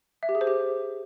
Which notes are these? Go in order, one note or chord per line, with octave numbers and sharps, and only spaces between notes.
E5
G4
G#4
C5
G4